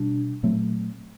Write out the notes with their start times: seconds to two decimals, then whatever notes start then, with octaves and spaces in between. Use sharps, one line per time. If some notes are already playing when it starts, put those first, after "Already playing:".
Already playing: B2 G3 D4
0.43 A#2 F#3 A3 C4